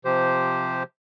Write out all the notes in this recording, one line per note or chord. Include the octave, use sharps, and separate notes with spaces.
C3 F3 G4 C5